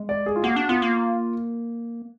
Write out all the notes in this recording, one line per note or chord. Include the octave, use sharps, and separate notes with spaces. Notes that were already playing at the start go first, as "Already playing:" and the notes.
Already playing: G#3
D5
G#4
F4
A#3 F#4
D4
B3 F4
A#3